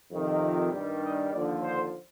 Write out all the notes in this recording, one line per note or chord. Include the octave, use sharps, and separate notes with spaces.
F2 C3 D#3
G2 D#3 G3
D#5
D#2 D3 F3 D5
C5